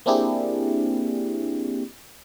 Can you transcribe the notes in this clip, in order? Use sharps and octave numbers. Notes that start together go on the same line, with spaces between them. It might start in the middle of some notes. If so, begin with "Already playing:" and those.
A#3 C4 D4 E4 G4 G#4